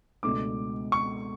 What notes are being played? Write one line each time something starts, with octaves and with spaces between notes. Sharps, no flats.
C#2 B2 A3 D4 D6
C#6